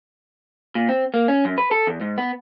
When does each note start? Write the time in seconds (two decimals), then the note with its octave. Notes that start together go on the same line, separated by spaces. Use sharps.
0.75 A#2
0.89 C4
1.14 A#3
1.28 C#4
1.45 F#2
1.58 B4
1.71 A4
1.87 E2
2.01 G#2
2.18 B3